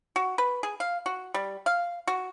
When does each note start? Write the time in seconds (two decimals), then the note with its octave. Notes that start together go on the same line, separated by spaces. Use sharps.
0.16 F#4
0.38 B4
0.63 G#4
0.80 F5
1.06 F#4
1.34 G3
1.66 F5
2.08 F#4